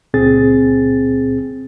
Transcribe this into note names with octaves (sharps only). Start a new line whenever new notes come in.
C#2 A#2 C4 G#4 A6